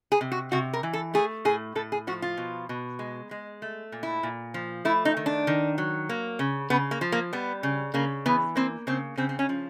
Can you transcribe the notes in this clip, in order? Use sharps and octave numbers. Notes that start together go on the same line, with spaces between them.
G#4
C3
F#4
C3 F#4
A#4
E3
A4
A3 G#4
A2 G#4
A2 A4
G#4
F3 F#4
F4
B2
B2
G#3
G#3
A3
A#2
E4
A#2
F3
A3 E4
D#4
D#3
D4
D#3
F#3
A#3
C#3
C#3 B3
A#3
F3
A#3
G3 B3
C#3
C#3 A#3
E3 B3
A#3 C4
C#3 C4
C#3 C4
C4
C#4
F3